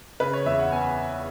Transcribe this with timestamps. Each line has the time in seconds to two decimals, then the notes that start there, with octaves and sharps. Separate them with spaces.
0.20 C#3 B4
0.33 C#5
0.46 E2 E5
0.60 F#5
0.72 B3 G#5